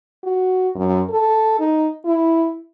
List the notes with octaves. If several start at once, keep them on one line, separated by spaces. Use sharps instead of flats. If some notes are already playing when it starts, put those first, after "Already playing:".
F#4
F#2
A4
D#4
E4